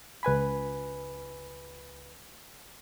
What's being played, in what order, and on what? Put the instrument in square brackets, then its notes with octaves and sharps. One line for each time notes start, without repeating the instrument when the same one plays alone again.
[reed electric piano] C#2 B4 G#5 B5